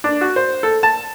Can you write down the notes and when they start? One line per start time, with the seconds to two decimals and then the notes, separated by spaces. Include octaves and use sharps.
0.04 D4
0.21 F#4
0.36 C5
0.63 A4
0.83 A5